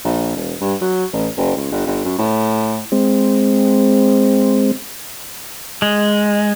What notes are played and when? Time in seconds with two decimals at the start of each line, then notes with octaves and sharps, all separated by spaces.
0.04 A#1
0.36 E1
0.61 G2
0.81 F#3
1.13 A1
1.37 F#1
1.56 C#2
1.71 G1
1.87 G1
2.04 F#2
2.18 A2
2.92 G#3 C4
5.82 G#3